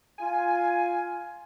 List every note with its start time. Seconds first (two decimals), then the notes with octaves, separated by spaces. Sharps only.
0.19 F4 G#5